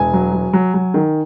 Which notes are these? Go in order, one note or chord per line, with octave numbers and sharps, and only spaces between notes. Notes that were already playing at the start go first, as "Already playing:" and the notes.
Already playing: E1 G#5
F#3
F#3
F#3
F#3
D#3